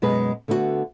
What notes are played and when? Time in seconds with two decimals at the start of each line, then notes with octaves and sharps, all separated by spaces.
0.02 F#2 B2 G#3 G#4 B4
0.48 D3 A3 B3 E4 F#4